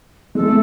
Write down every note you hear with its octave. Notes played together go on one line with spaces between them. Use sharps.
G#3 A4
A3